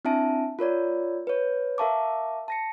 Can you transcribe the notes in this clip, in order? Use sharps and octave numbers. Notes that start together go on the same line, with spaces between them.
C4 D4 E4 E5 A5 D7
F4 A#4 C#5 D5
B4 C#5
A#4 E5 F5 A5 C#6 D6
A5 A#6 C#7